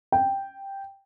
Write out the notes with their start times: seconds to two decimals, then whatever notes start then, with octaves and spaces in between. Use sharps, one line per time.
0.12 G5